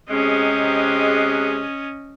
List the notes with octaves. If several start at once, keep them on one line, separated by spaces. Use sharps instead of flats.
C3 G#3 C#4 D#5